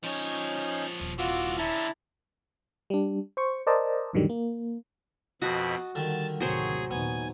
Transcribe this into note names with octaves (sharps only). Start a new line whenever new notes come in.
F3 C#4 D#4 C#5 G6
D#1 D#2
C2 E3 F4 F#4 D6
D3 C#4 E4 A5 A#5
G3 D4
C5 C#6
A#4 C5 D5 D#5 A5
F2 A2 D3 D#3 F#3 G3
A#3
F2 B2 F#4 D#5 A5 B5
D3 D#3 G3 A5
A1 D#2 C3 F#3 G#4 C5 C#5
D#2 A#2 D#3 B3 G#5